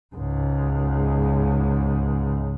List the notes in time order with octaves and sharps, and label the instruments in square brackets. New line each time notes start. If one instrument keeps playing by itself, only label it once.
[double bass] C#2 G#2